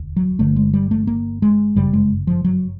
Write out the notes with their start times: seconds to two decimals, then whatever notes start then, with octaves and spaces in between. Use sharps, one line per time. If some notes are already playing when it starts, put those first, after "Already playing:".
Already playing: E1 D2
0.17 F#3
0.39 G1 G2 D3 A3
0.56 G#3
0.74 G3
0.91 A3
1.07 A#3
1.42 G#3
1.75 G1 F#2 C#3 G3
1.93 G#3
2.27 F3
2.44 F#3